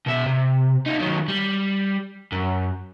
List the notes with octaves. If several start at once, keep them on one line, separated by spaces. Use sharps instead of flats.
B2 E5
C3
D#4 F4
D#3 F#3
G3
F#2